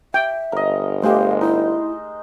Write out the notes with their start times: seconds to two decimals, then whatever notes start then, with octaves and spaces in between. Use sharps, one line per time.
0.14 E5 G5
0.52 G1 A#4 D#5
1.03 G#3 A3 G4 C5 F5
1.41 D#4 E4